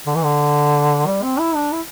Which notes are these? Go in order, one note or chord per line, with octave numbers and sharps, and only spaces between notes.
D3
E3
D3
G3
C4
E4
D4
E4